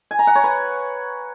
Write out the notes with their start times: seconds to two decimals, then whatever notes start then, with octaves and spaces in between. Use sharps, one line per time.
0.11 G#5
0.19 A#5
0.27 F#5
0.36 C#5
0.44 B4